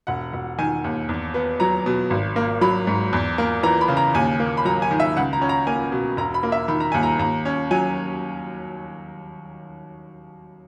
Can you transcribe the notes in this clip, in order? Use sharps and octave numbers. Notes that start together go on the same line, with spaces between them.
E1 F#5
E1
D#3 G#5
D#2
E2
B3
F#3 A#5
B2
G#1
A#3
F#3 B5
G#2
E2
A#3
E3 A#5
B5
C#3
A#5
D#2 G#5
A#3
B5
F#3 A#5
G#5
D#3
E5
C#2 F#5
A#5
C#4
A#5
A#3 G#5
B2
E1 A#5
B5
A#3
E5
D#3 B5
A#5
D#2 G#5
A#5
D#2 A#5
C#4
F#3 G#5